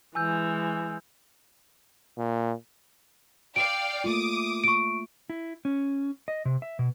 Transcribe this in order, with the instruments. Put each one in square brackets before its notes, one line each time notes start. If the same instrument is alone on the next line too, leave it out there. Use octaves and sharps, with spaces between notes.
[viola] E3 G#3 [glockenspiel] G#5 E6 G6
[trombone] A#2
[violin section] D5 F5 G5 [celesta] D7
[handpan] A3 A#3 F4 [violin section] D6 D#6
[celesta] C#6 D7
[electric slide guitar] E4
C#4
D#5
C3
E5
B2